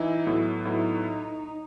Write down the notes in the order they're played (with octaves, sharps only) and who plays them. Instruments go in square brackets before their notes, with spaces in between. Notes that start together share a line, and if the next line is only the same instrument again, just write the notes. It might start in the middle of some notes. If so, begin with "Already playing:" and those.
Already playing: [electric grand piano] E3 D#4 [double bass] E4
[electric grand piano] A2 F#3 B3
[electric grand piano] A2 F#3 B3 E4 [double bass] D#4